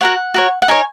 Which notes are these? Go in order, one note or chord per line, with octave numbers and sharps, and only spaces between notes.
F#4 A#4 C#5 F#5
F#4 A#4 C#5
F#5
D#4 A#4 C#5 G#5